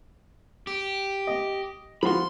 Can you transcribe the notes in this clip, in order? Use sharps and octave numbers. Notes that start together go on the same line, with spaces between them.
G4
D#5
F3 F#4 B5 C6